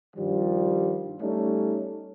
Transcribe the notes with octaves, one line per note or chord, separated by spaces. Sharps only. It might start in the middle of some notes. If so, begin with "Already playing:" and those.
G2 D#3 F3 G3 F4
G3 A3 C#4 D#4 A4